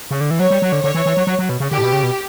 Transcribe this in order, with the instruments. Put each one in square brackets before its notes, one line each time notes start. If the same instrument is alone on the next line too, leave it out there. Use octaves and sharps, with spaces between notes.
[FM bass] C#3
D3
E3
[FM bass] F#3 [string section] C#5
[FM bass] G3
F#3
D3
[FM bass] D3 [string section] C#5
[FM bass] E3
E3
F#3
F#3
F#3
B2
C#3
[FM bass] D3 [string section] G4
[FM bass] A2
B2
C#3
B2